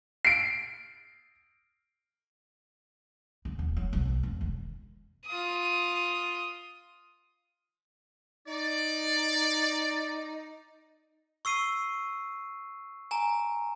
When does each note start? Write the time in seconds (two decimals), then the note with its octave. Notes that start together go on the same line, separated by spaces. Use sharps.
0.25 C7 D7
3.45 D3
3.59 D#1
3.77 F#3
3.93 B1
4.05 B1
4.23 E1
4.41 D#3
5.26 F4 D#6
8.47 D#4 D5
11.45 C#6 E6 C7 D#7
13.11 G#5 A#5